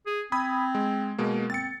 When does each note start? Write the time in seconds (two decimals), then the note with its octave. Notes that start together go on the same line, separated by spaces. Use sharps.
0.06 G#4
0.32 C4 B5 D#6 G#6
0.75 G#3
1.18 B2 G#3 A#3
1.50 C4 A6 C#7